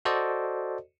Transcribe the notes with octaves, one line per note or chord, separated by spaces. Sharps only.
F#4 A4 C5 D5 D#5